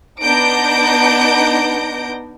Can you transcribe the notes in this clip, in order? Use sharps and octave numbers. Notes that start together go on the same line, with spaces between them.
B3 D4 D#4 G6 A#6 D7